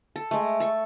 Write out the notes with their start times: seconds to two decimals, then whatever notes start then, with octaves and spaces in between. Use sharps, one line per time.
0.16 A4
0.31 G#3 A3
0.60 A4 C#6